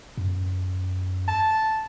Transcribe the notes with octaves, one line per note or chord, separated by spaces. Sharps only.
F#2
A5